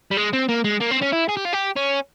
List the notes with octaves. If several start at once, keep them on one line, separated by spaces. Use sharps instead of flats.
G3
G#3
C4
A#3
G#3
A#3
C4
C#4
E4
G#4
G4
F4
G4
C#4